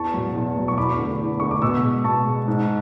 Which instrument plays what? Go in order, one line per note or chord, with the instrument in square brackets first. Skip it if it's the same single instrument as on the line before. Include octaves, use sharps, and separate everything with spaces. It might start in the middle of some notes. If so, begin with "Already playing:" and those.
Already playing: [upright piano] E2 A5 C#6
B2 F#3
E2
B2 F#3
C#6
E2 B5 D6
D3 A3
E2
D3 A3 C#6
D6
B2 C#6 E6
G#3
B2 A5 C#6
G#3
G#2